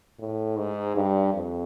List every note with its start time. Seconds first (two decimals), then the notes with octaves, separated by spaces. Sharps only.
0.19 A2
0.57 G#2
0.96 G2
1.34 F2